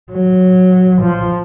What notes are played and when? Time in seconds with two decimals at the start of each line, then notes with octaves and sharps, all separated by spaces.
0.12 F#3
1.01 F3